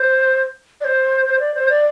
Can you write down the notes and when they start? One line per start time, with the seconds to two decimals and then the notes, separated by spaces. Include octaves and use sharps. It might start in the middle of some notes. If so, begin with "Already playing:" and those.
Already playing: C5
0.80 D5
0.84 C5
1.25 C5
1.39 D5
1.54 C5
1.69 D5